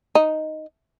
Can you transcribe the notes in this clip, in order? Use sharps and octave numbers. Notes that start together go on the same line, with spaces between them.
D#4